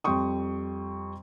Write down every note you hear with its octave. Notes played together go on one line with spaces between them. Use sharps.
F2 G3 G5 C6 C#6 D#6